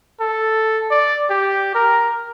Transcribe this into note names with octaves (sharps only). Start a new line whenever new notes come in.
A4
D5
G4
A#4